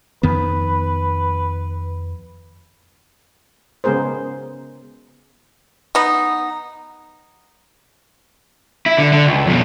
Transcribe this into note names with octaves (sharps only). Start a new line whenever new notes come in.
F2 D#3 B3 B4
C#3 G#3 B3 G#4 A#4 C5
B3 D#4
E4
D3
D3
C#2
F2 B2